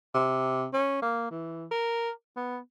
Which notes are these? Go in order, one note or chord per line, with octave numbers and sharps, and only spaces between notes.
C3
C#4
A#3
E3
A#4
B3